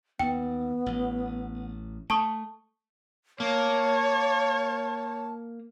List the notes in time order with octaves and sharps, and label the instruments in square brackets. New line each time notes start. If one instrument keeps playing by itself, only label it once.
[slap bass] D#2 [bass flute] B3 [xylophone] G5
[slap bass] A1
[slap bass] A3 [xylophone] A5 C#6 D#6
[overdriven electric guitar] A#3 [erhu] C#5 [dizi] A5